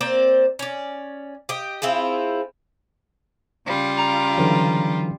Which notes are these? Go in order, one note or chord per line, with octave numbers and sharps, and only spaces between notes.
A#3 C4 C5 D5
C#4 D5
G4 D#5
C4 E4 F4 G#4
C#3 G3 F4
A#5
D3 E3 F#3